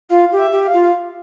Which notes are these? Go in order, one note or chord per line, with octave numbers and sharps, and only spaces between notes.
F4 F5
G4
E5
G4
F5
F4